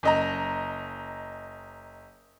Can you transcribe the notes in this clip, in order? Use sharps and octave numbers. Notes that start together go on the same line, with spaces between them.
F#1 D#5 A#5